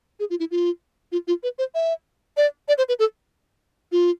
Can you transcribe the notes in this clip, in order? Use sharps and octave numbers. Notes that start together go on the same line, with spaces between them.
G#4
F4
E4
F4
F4
F4
B4
C5
E5
D5
D5
C5
B4
A4
F4